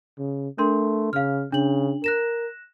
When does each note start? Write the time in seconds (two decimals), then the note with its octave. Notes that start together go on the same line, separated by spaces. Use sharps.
0.19 C#3
0.58 A3 D4 A#4 C6
1.13 C#3 F5 F6
1.52 C#3 D4 F#7
2.04 A#4 F#6 A#6 E7